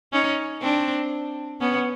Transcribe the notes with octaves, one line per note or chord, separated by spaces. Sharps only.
C#4 D#4
C4 D4
B3 C#4